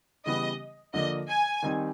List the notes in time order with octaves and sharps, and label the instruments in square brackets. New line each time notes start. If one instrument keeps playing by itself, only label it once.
[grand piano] C#3 E3 G3 B3 [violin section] D#5
[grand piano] D3 F3 A#3 D4 [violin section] D#5
[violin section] G#5
[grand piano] D#3 G3 C4 D#4